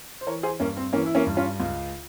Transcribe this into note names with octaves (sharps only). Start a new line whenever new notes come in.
C5
E3 A#4 C#5
G#4 C5
G2 A#3 C#4
C4
E3 A#3 C#4
E4
A#3 C#4
G2
C#4 F4
C#2